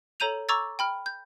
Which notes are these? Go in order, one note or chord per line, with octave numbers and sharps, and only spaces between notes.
A4 C#5 A#5 G6 D#7 F7
A#5 C#6 D6 E6 G#6 A6
G5 B5 F6
G6